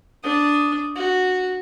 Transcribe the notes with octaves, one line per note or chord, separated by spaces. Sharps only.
D4 D#6
F#4